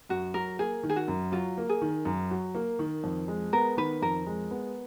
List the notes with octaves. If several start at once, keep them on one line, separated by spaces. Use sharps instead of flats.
F#2 F#4
F#3 A#4
A#3 G#4
D#3
G#4
F#4
F#2
F#3 F4
A#3
G#4
D#3
F#2
F#3
A#3
D#3
F2
G#3
B3 A#4
D#3 B4
F2 A#4
G#3
B3